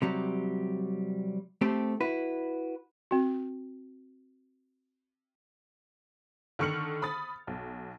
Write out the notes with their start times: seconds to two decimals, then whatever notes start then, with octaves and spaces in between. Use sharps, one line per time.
0.02 C3 F#3 G3
1.61 A3 C4 G4 A4
2.01 E4 F#4 B4
3.11 C4 F#4
6.59 D3 D#3 C#6 F6 C#7 F#7
7.02 B5 D#6 A6
7.47 B1